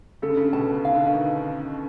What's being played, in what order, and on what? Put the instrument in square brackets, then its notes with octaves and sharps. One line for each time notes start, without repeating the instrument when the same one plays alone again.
[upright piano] C#3 [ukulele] A4
[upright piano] D3
C#3
[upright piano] B2 [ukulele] A5
[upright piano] D#3 [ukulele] F5
[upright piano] D3
D#3
[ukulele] D#4